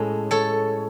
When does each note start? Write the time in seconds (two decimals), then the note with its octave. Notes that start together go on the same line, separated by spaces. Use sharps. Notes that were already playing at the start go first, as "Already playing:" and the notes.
Already playing: A2 G#3 C#4 A4
0.31 A4 C#5